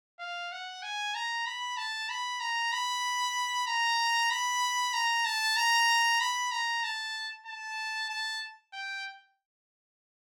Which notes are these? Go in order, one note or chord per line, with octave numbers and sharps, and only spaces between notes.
F5
F#5
G#5
A#5
B5
A5
B5
A#5
B5
A#5
B5
A#5
A5
A#5
B5
A#5
A5
A5
A5
G5